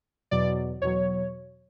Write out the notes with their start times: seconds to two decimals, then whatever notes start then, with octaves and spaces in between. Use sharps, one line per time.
0.31 E2 B2 F#3 D5
0.82 E2 B2 F#3 C#5